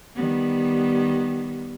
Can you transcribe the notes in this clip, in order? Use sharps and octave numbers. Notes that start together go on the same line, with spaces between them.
D#3 G3 B3